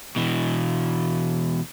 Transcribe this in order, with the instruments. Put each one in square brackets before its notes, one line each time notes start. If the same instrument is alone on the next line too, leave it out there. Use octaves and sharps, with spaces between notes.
[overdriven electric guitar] B2 E3